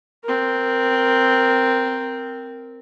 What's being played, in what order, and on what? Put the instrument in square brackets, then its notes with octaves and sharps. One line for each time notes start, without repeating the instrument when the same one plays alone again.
[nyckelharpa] C4 A#4